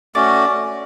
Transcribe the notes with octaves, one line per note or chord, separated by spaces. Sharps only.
A3 C#4 F#4 D5